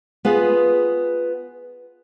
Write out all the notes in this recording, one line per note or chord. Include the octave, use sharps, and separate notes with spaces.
B3 F4 G#4 B4